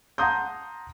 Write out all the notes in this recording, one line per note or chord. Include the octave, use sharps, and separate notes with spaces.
F#5 A5 A#5 C6 D#6 G6